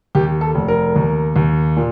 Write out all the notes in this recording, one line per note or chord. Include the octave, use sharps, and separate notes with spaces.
D#2 G4
A4
F1
A#4
D#2
D#2
A#2